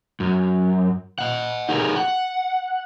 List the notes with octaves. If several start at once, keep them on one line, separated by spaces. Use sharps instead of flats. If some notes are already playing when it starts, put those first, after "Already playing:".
F#2
D#5 F#5
D#4 G4 G#4 A#4
F#5